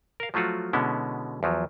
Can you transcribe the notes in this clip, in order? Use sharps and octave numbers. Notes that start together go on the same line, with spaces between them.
A#4 F5
F3 F#3 A3 F4 F#4
B2 D3 G#3 B3 C#4 E4
E2 F3 F#3